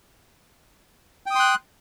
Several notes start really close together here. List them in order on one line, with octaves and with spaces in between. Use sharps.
G5 D#6 C6 F#6